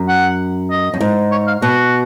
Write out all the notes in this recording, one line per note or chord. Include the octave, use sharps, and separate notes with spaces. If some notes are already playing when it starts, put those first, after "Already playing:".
Already playing: F#2
F#5
D#5
F#2
G#2
C#5
F5
B2 F#4